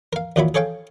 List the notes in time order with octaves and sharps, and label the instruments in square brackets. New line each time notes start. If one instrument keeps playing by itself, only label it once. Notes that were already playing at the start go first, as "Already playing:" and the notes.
[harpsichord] A#4 F5
D#2 A#2 D#3 F#3 E4 B5
G#4 A4 C#5 F5 G5